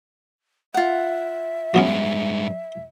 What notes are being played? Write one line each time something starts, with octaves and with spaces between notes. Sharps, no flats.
F4 E5 F#5
G2 F#3 G#3 B3 C#4